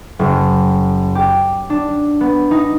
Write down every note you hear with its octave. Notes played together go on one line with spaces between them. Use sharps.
F#1
G4
D4
B3
D#4